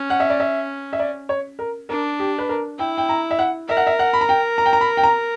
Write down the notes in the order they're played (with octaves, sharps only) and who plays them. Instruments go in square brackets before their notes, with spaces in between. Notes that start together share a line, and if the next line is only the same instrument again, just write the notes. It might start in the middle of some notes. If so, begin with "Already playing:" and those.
Already playing: [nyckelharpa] C#4
[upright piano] F#5
E5
D5
E5
E5
D5
C#5
A#4
[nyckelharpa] D4 [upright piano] A#4
[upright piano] G4
B4
A#4
[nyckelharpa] E4 [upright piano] G5
[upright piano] G5
A#5
E5
F#5
[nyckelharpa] A#4 [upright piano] E5
[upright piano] F#5
E5
F#5
B5
A#5
G5
A#5
G5
A#5
B5
G5
A#5